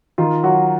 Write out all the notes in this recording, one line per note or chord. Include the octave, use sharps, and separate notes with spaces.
D#3 F4
F#3 F#4